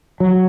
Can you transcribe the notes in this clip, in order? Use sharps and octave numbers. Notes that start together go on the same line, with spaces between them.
F#3